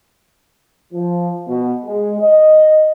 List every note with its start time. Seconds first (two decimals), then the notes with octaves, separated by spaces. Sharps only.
0.93 F3
1.48 B2
1.85 G#3
2.20 D#5